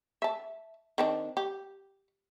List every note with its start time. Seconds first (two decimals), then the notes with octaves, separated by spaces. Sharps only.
0.22 E5 A5
0.98 D#3 C4 D4
1.37 G4